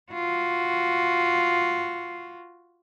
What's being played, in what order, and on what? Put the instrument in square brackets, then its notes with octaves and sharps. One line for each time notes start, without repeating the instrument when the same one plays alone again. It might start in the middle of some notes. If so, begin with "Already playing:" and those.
[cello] F4 F#4